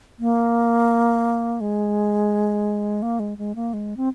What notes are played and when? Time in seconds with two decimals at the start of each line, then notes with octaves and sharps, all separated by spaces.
0.19 A#3
1.61 G#3
3.02 A#3
3.19 G#3
3.38 G#3
3.55 A#3
3.73 G#3
3.97 C4